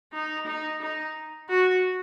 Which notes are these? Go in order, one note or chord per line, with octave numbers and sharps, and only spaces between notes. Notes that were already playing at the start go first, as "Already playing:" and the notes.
D#4
D#4
D#4
F#4